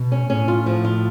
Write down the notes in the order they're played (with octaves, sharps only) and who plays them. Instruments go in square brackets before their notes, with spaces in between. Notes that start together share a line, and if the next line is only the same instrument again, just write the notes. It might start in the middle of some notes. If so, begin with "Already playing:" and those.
Already playing: [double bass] B2
[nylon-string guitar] C#4
[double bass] A2 [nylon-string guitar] C#4
[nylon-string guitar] F4
F3
F4